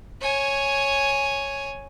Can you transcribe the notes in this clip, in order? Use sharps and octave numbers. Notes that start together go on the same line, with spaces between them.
C#5 G#5